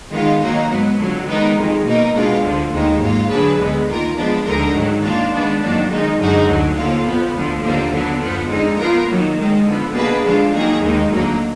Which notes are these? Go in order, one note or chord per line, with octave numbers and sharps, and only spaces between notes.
D#3 G#3 B3 F4
D#3 F#3 A#3 D#4
G#2 F#3 B3
F2 D3 F#3
D#3 G#3 B3 D#4 A#4
F2 D#3 G#3
B2 A#3 D#4 A#4
B2 G#3 D4 F4
D2 D3 F3
D#2 D#3 G#3 D#4
G#2 F#3 A#3 F4
D3 F#3 D4 G#4 B4
D2 D3 G#3 B3
D#3 A#3 F4 A#4
F3 G#3 B3 D4
D2 D3 G#3 D#4 A#4
G#2 D#3 F#3
D#3 A#3 D4 F4
D#3 G#3 B3 D4
F2 D#3 F#3 A#3 D4
D#3 G#3 D#4
F#2 D3 G#3 D#4 F#4
D2 D3 F#3
D#2 D3 F3 A#3 F4
F2 F3 B3
D2 D3 F3
D#2 D3 F3 A#3 D4
D3 F#3 B3
F#2 F3 B3
F2 D3 G#3 D#4
F3 B3 F4 A#4
D#3 F#3 A#3
D#3 G#3 D#4
D3 F3 B3
B2 A#3 D4 G#4 B4
D3 F3 G#3 D4 F4
D#3 F#3 A#3 D#4 G#4
D#2 D#3 G#3 D#4
D2 D3 F#3 A#3 D#4